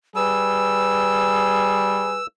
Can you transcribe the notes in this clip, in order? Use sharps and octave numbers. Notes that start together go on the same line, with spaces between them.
G3 G#4 B4 E6